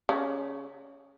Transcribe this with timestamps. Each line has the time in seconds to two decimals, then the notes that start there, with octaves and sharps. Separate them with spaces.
0.09 C#3